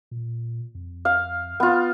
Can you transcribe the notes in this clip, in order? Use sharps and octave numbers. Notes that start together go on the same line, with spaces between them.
A#2
F2
F5
B3 F4